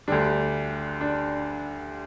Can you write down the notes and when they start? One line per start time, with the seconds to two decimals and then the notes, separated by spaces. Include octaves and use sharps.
0.08 D2 D3 G3 D4
1.01 D4